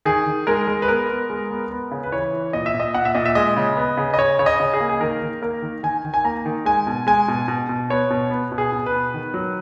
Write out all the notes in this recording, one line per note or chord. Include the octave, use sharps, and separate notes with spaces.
D#3 G#4
D#3
G#3 A#4
G#3
B4
B3 A#4
B3
G#3
B3
B3
C#3
B4
E3 C#5
E3
A#2 D#5
E5
A#2
D#5
A#2 F#5
E5
A#2 D#5
E5
G#3 D#5
C#3
B3
C#3
D#5
C#3 C#5
C#3 C#5
D#5
C#3
G#4
A#3
G#4
D#3 A#4
D#3
A#3 A#4
D#3
D#3 G#5
D#3
G#5
A#3 A#5
D#3
G#3 G#5
B2
G#3 G#5
B2
B2
B2
B3 C#5
B2
B3
B2
G#4
B2
B4
B3
D#3
F#3